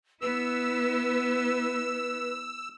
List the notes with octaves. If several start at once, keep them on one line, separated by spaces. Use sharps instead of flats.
B3 E4 B4 E6